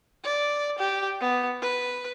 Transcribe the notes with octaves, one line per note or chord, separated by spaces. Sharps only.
D5
G4
B3
B4